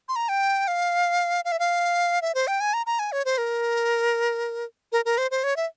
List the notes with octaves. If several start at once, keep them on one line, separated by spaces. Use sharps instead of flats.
C6
A#5
G5
F5
F5
E5
F5
E5
C5
G5
G#5
A#5
A#5
G#5
C#5
C5
A#4
A#4
A#4
C5
C5
C#5
E5